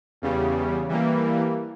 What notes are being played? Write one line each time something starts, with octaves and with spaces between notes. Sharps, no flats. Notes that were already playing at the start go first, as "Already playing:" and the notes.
E2 C#3 G3
E3 G3 A#3